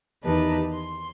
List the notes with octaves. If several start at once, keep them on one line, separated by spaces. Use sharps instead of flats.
E2 D#3 D#4 G4 B4 A5
C6